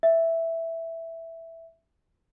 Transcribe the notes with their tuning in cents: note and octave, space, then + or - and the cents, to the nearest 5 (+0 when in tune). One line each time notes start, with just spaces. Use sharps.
E5 +0